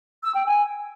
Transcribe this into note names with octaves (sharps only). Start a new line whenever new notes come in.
E6
G5
G#5